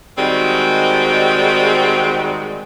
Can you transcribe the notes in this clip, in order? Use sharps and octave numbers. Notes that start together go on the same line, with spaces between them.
D#3 G3 G#3 C4 D#4 F#4